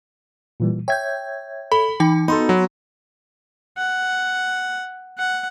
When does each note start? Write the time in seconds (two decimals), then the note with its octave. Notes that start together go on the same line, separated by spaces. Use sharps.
0.60 A#2 E3 G3
0.88 C#5 E5 G5 G6 G#6
1.72 A4 B5
2.00 E3 D#4 G5
2.28 B3 D#4 F#4 A4 B5 C6
2.49 F#3
3.78 F#5
5.18 F#5